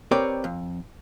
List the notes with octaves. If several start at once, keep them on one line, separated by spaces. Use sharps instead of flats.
C4 G4 A#4 B4 C#5 D5
F2